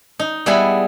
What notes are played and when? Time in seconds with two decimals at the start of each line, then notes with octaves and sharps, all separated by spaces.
0.19 D#4
0.46 G3 B3 E4 G#4 F#5 B5